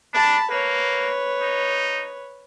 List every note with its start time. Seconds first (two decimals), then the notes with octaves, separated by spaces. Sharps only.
0.14 D4 A5 B5
0.50 A#3 B4 C#5
1.42 D#4